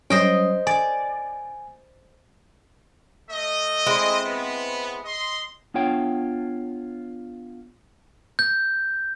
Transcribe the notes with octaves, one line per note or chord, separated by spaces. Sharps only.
F#3 G3 C#4 C5 D#5 G5
D5 G#5
A3 D#5
G#3 C4 E4
B3
D#5 C6
B3 D4 F4 C#5 G5
G6